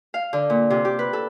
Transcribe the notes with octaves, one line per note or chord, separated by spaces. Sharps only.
F5
D3
A#2
C3
G4
B4
A4